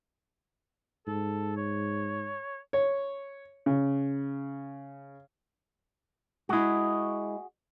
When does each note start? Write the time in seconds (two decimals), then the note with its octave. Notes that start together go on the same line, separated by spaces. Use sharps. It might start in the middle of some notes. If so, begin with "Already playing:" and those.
1.07 G#2 A4
1.56 C#5
2.73 C#5
3.66 C#3
6.49 G#3 E4 F#4 G#4